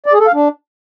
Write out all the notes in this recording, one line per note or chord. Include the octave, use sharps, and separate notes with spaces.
D5
G#4
A4
F5
D4